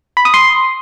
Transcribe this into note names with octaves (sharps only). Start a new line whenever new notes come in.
B5
D#6
C6